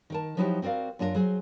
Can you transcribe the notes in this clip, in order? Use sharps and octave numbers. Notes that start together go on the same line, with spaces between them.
D#3 A#4 A5
F3 F#3 D#4 E4 F#4 G4
C4 F#4 A#4 D5 F5
F#2 D4 F4 G4 A#4
F#3 G#4 C5